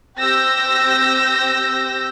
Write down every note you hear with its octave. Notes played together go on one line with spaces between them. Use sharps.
C4 G4 E6 G6 A#6